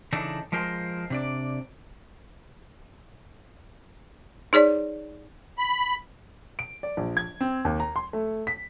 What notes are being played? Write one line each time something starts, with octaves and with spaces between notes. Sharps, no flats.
C#3 E3 D4 D#4 A4
F3 G#3 A#4 C5
C3 D4 D5
D#4 G#4 C#5 D5
B5
D7
D5
A#1
G#6
C4
D#2
A#5
C6
A3
B6